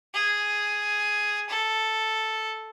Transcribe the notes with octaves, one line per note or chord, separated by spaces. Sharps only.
G#4
A4